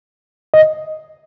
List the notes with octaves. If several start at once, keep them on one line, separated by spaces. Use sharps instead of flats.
D#5